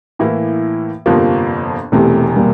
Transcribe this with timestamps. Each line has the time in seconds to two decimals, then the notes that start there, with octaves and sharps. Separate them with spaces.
0.19 A2 E3 A#3 E4
1.06 G1 F2 C3 F3 A#3
1.92 E1 E2 C3 A3 C4
2.36 G3 A#3